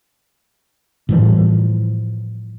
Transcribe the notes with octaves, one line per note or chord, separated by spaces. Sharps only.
A2 E3 F3 G3